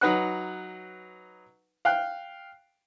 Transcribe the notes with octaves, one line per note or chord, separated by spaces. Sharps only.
F#3 D#4 B4 F#5 F#6
F5 G5 F#6